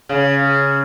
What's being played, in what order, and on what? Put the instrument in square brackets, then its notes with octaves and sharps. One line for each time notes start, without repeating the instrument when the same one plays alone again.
[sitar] C#3